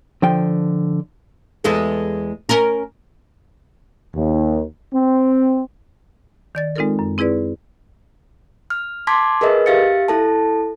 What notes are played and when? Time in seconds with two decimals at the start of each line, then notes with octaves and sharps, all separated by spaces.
0.22 D3 F3 G5
1.64 E2 G#3 A4
2.49 C#4 A#4
4.15 D#2
4.94 C4
6.55 D#3 D5 A6
6.76 G#3 C4 D#4 F4 A4 A#4
6.99 F#2
7.18 C4 E4 G#4 B4 D5
8.70 F6
9.07 A5 C6 D6 G#6 B6
9.41 G#4 A#4 B4 D#5 E5
9.66 G4 E5 F5 A6 C#7
10.08 E4 A4 A5